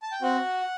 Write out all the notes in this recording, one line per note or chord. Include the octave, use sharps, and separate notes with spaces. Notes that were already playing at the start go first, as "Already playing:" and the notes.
A5
G5
C4 F#4 F#5